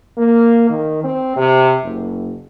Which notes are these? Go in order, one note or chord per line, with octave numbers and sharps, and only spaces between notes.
A#3
D#3
C4
C3
F#1